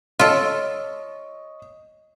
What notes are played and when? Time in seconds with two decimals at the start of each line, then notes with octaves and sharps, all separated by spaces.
0.19 F4 A4 C#5 D#5